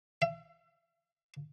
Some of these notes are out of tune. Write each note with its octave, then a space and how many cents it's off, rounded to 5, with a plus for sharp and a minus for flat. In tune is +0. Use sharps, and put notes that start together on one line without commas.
E5 +35